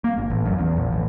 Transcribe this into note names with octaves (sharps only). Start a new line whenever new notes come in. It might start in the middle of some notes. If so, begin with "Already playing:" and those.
A#3
G1
A1
F#2
E2
A#1
A1